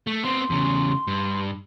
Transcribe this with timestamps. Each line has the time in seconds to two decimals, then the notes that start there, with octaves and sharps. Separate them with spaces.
0.07 A3
0.24 B3 C4 C6
0.50 E2 C#3
1.07 G2